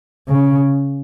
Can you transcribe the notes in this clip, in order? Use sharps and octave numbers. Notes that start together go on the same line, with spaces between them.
C#3